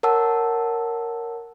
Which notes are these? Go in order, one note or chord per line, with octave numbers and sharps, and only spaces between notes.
A#4 C#5 F#5 A5 E6